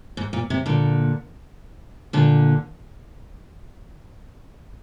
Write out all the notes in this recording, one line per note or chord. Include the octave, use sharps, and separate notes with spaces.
G#2
A#2
C3
A#2 D3
A#2 D3